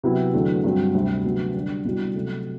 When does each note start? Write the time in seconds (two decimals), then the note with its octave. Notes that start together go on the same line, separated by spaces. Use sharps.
0.03 C3 F#3 B3 E4
0.33 E2 D3 F#3 A3
0.64 G2 F#3 C4 F#4
0.94 D2 C3 G3 C4
1.25 D2 C3 F#3 B3 F#4
1.54 D3 G3 D4
1.84 C2 B2 G3 D4 F#4
2.15 C3 F#3 A3